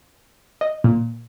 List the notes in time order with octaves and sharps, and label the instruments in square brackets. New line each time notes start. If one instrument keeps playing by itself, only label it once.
[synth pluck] D#5
A#2